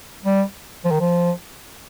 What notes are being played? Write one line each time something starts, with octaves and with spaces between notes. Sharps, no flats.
G3
F3
D#3
F3